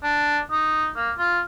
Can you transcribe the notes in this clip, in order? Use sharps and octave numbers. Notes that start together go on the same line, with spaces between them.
D4
D#4
A#3
F4